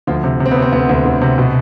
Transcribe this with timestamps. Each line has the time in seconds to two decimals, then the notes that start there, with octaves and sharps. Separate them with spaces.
0.07 D2 F3 F4
0.24 C3
0.40 C3
0.46 C4
0.51 B3
0.56 C3
0.62 C4
0.73 D2 B3
0.89 D2
1.05 D2
1.22 C3
1.38 B2